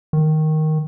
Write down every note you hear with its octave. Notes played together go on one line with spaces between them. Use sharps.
D#3